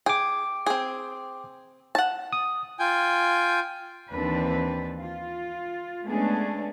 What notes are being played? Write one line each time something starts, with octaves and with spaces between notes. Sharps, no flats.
G#4 G5 D6
C4 G#4
F#5 A5
D#6
F4 G5 G#5
D#2 E3 C4 D4 B4
F4
G#3 A3 B3 C#4 D4 G#4